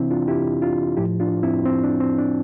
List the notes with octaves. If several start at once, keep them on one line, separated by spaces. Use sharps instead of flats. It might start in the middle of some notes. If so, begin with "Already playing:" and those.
Already playing: C3 E3 C4 D4 E4
D4 F4
E4 G4
D4 F4
A2 F3 E4 G4
D4 F4
C4 E4
C4
D4
C4
D4